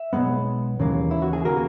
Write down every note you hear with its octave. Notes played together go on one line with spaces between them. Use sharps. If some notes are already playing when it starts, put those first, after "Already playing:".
Already playing: E5
B1 A#2 G#3 B3
D#2 C#3 E3 A#3
E4
F#4
G#4
C#3 E3 A#3 F#4 A#4